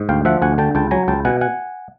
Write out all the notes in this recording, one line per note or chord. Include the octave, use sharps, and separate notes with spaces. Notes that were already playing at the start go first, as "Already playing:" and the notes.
Already playing: G#2
D2 F5 G5
F3 E5 F#5
D2 F#5 G#5
D3 G5 A5
C#2 G5 A5
F#3 G#5 A#5
C#2 G5 A5
B2 F#5 G#5
F#5 G#5